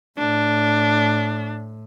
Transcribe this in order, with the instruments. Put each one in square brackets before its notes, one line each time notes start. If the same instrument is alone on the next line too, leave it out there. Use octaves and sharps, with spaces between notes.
[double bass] A2 [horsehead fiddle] D4